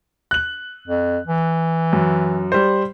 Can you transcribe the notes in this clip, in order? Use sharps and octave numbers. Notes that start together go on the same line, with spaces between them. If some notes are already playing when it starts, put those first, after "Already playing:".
F#6 F#7
F2
E3
F#2
G3 C5